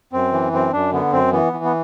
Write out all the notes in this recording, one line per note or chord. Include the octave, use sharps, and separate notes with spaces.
F#2 C4
E3
F#2 C4
F#2 D4
D3 B3
F#2 C4
E3 B3
E3
B3